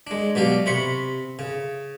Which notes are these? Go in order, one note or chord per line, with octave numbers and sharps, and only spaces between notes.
G#3 D4
B2 F#3 G4 D5 F5
C3 C5 B5 C#6
C#3